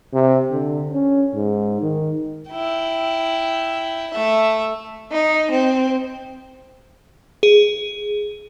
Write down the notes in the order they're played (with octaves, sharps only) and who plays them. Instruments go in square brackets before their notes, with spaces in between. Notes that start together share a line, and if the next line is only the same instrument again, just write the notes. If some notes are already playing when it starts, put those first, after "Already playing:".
[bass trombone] C3
D3
C#4
G#2
D#3
[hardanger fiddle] E4 G5
A3 E5
[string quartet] D#4
C4
[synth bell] G#4